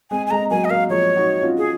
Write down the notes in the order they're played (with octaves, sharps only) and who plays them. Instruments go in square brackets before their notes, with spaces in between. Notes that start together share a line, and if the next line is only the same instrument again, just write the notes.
[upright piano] G#3 C4 [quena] G#5
[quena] G#5
[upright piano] G#3 C4 [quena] A#5
[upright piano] F#3 A#3 [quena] G#5
[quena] D#5
[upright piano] F#3 A#3 [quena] F5
[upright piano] F3 G#3 [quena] C#5
[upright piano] D#4 F#4
C#4 F4
[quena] G#4